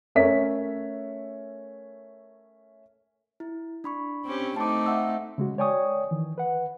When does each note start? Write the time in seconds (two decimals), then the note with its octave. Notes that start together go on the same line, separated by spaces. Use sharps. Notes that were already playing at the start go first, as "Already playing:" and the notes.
0.15 A3 C#4 A#4 C#5 E5 B6
3.40 E4
3.84 D4 B5 C#6
4.25 C4 C#4 G4
4.56 A3 C4 D#4 A5 D6
4.86 E5 F#5 E6
5.38 C#3 G#3 F#4
5.58 C#5 D5 G5 G#5 C#6 D#6
6.11 D#3 E3
6.38 B4 F#5